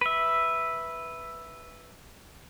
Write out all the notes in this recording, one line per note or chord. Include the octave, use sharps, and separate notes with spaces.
B4 E5